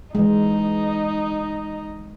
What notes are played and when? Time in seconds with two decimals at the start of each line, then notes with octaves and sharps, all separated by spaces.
0.15 E3 G#3 D#4